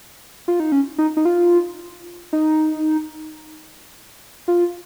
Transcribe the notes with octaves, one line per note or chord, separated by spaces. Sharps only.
F4
D#4
C#4
D#4
D#4
F4
D#4
F4